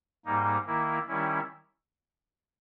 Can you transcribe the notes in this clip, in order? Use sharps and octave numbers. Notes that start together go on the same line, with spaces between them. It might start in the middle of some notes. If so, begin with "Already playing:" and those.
G#2 G3 A#3 D#4
D#3 A#3 E4
D#3 G3 C#4 E4